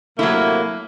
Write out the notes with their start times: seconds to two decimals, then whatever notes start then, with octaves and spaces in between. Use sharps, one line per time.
0.19 C3 F#3 A3 A#3 E4